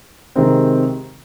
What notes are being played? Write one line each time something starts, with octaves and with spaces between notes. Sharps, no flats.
C3 D#3 G#3 C4